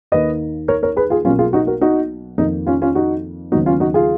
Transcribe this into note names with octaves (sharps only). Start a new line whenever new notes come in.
D#2 D#3 A#3 B4 D#5
A#4 C#5
A#4 C#5
G#4 B4
F4 G#4
B1 B2 A#3 C#4 F4
F4 G#4
D#4 F#4
F#4 A#4
D#4 F#4
F2 D#3 A#3 D#4
C#4 F4
C#4 F4
D#4 F#4
D#2 C#3 F#3 B3 D#4 F#4
C#4 F4
D#4 F#4
F4 G#4